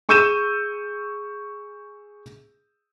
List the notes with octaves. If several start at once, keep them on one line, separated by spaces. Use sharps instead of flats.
G#4 C#6 E6 G6 D#7 E7